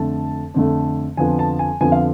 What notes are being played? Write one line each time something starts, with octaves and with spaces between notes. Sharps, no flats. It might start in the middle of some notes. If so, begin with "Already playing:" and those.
Already playing: F2 D3 A3 A5
F2 D3 A3
F2 D3 F3 B3 G#5
A5
G#5
F2 D3 F3 B3 G#5
F5